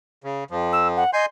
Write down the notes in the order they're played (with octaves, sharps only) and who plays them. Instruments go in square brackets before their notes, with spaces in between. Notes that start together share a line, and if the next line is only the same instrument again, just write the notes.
[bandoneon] C#3
F2 F3
[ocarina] E6
F#5
[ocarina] D#5 [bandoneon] G#5 C6 G6